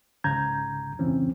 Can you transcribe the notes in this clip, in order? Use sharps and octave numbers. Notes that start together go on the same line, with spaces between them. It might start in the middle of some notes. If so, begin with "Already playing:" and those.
C2 G#2 C#3 A#5 G6 G#6
F2 G#2 C#3 E3 C4 C#4